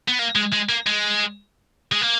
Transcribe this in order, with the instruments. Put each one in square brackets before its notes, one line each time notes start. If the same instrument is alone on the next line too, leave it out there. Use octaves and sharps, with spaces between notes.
[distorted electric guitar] B3
A#3
G#3
G#3
A#3
G#3
G#3
A#3